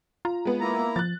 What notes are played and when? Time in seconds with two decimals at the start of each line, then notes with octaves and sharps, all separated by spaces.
0.25 F4 A#5
0.45 G#3 B3
0.61 A#3 E4 A#5
0.96 F3 F#6 A6